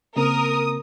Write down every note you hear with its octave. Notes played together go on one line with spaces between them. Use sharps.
C#3 A#3 C4 A#4 D#6